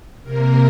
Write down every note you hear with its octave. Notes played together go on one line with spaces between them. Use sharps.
C3 A#3 A#4